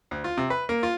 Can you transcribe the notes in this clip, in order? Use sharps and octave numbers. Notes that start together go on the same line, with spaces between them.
D2
F4
C3
B4
A#3
F4